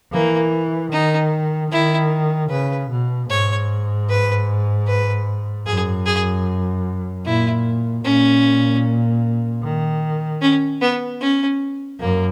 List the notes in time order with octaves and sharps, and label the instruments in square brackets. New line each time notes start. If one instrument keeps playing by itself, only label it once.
[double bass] E3 [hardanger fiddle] A#3
[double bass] D#3 [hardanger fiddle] D#4
[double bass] D#3 [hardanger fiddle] E4
[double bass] C#3 [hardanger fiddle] B4
[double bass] B2
[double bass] G#2 [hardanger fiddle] C#5
[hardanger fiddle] B4
B4
[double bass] F#2 [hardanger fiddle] G#4
[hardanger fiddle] G#4
[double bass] A#2 [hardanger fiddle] E4
[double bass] A#2 [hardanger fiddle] C#4
[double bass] D#3
[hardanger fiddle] C#4
B3
C#4
[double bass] F#2 [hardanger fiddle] A#3